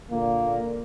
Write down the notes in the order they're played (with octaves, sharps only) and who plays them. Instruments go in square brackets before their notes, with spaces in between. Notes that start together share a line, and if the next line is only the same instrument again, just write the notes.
[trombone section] A#2 D3 A#3